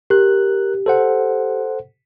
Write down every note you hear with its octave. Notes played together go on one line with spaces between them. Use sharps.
G4 A#4 F#6
A4 C5 F#5